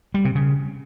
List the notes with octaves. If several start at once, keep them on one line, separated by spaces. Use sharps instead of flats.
G3
C3
C#3